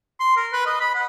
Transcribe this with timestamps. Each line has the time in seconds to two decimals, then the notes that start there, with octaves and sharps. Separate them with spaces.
0.20 C6
0.36 A#4
0.53 B4
0.66 D#5
0.80 B5
0.95 F#5